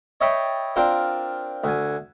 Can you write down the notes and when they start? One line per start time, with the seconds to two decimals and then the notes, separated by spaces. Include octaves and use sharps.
0.21 C#5 D#5 E5 G5 A5 B5
0.76 C4 D4 F4 A#4 C5
1.64 D2 G#5